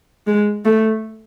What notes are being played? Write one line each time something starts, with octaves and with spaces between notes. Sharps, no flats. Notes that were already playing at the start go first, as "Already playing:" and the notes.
G#3
A3